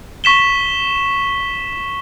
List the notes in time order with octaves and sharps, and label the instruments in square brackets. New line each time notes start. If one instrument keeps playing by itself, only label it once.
[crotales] C#6 B6 E7 G7